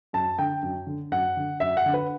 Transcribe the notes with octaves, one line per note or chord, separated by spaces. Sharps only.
F#2 A5
D3 G5
F#2
D3
F#2 F#5
D3
F#2 E5
F#5
D3
B4